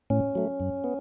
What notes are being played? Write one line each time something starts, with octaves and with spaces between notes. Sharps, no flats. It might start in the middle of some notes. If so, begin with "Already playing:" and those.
A2 C#4
F#3 A3
F#2
B3